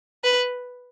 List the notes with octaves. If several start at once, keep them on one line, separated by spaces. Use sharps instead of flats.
B4